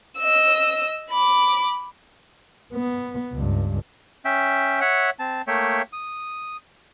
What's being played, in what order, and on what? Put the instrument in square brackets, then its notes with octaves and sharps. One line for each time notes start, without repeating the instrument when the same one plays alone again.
[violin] D#5 E6
B5 D6
[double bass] B3
C#2 G2
[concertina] C#4 E5 G5
C#5 E5 F#5
C4 A5
A3 A#3 C#5 E5 G5
D#6